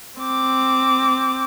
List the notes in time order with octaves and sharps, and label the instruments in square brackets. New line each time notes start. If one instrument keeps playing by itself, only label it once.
[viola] C4 D6